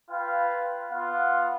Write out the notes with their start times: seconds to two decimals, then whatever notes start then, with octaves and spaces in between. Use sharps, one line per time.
0.10 F4 B4 F5 G5
0.91 B3 F4 F5 F#5